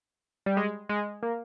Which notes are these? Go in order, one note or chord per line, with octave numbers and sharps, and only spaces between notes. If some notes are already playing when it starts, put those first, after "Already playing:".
G3
G#3
G#3
A#3